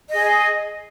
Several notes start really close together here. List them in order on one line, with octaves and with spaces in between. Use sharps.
D#5 G#4 G#5